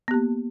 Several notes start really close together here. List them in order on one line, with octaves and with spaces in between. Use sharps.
B3 G4 A#3